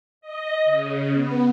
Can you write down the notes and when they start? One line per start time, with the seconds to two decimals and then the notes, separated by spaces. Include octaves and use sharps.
0.21 D#5
0.65 C#3
1.13 B3